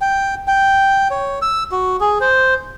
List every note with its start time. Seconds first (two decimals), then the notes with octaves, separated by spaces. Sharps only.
0.01 G5
0.48 G5
1.11 C#5
1.42 E6
1.72 F#4
2.00 G#4
2.21 C5